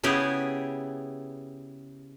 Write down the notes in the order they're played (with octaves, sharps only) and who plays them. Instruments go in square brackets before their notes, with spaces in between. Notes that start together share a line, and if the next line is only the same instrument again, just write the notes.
[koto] C#3 B3 E4 G4 G#4